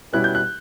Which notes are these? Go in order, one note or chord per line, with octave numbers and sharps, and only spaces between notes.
B2 G3 C#4 E4 F#6
G6
F#6